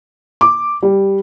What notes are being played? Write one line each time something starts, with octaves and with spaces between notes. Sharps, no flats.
D6
G3